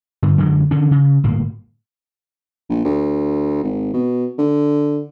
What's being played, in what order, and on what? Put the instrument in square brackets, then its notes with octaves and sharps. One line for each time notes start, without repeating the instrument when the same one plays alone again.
[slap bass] G2 D3
F#2 D3 F#3 G#3
D3 D#3 C#4 D4
C#3
G1 A2 A#3
[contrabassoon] A#1
D2
G#1
B2
D3